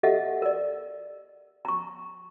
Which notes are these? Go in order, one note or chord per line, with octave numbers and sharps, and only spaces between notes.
G4 A4 D#5 E5 F#5
A#4 D5
A#5 C#6